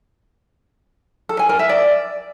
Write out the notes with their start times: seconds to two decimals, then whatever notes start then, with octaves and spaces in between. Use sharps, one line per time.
1.29 A4
1.39 G#5
1.49 A#4
1.59 E5
1.69 D5